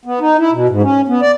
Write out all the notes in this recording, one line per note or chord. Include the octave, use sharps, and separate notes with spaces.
B3
D#4
E4
B2
G#2
C#4
B3
D5